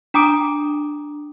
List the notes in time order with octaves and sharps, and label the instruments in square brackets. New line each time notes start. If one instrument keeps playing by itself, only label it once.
[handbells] D4 G5 A#5 D6 D#6 D7